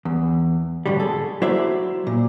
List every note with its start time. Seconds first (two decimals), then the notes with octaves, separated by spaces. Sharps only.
0.05 E2
0.86 G#2 D3 F#3 G3
1.00 G#4 A4
1.42 F#3 E4 C5 D5 E5
2.07 A#2